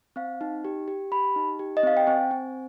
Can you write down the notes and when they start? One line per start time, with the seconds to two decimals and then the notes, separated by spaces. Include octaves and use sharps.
0.16 C4 F5
0.41 D#4
0.64 G4
0.88 G4
1.12 G4 B5
1.36 D#4
1.59 G4
1.77 D#5
1.83 C4 F5
1.97 G5
2.07 C4 G#5
2.31 C4